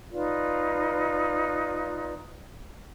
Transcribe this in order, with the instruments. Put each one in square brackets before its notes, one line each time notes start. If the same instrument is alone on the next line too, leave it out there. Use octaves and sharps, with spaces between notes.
[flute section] D#4 F4 B4 D5